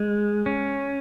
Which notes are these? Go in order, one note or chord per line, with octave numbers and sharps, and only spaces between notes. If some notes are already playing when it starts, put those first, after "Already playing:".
Already playing: G#3
C#4